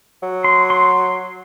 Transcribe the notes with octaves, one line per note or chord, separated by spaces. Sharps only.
F#3
C6
C6